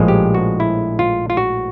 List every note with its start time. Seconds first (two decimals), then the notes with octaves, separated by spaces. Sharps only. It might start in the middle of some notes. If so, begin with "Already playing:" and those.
Already playing: A#1 A2 F3 G#3
0.08 G4
0.34 F#4
0.60 E4
0.99 F4
1.30 F4
1.37 F#4